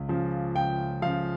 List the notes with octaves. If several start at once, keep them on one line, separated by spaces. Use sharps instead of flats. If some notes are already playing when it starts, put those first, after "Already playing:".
Already playing: C#2
C#3 F3
C#2 G5
C#3 F3 F5